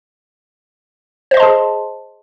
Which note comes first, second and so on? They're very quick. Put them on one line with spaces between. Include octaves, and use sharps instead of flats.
C5 D#5 C6 A5 G#4